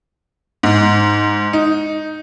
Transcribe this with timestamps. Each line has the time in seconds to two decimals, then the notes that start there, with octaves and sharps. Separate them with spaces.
0.63 G#2
1.53 D#4